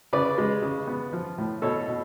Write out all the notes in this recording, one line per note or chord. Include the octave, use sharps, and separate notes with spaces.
C#3 B4 D5
G#3
C#3
B3
F3
A2
B2 A4 C#5
B2